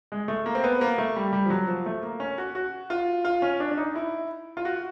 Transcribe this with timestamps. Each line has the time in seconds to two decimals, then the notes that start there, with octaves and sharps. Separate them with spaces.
0.12 G#3
0.28 A3
0.46 A#3
0.55 C4
0.64 B3
0.81 A#3
0.98 A3
1.16 G3
1.33 G3
1.46 F3
1.50 F#3
1.68 F3
1.86 A3
2.03 A#3
2.20 C#4
2.38 F#4
2.55 F#4
2.90 F4
3.25 F4
3.42 C#4
3.60 D4
3.71 D4
3.77 D#4
3.95 E4
4.57 F4
4.65 F#4